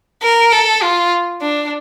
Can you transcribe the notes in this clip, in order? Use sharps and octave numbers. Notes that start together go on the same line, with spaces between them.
A#4
A4
F4
D4